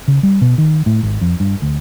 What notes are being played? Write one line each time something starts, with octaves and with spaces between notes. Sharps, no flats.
C#3
G3
B2
D#3
A2
G#1
F2
G2
D2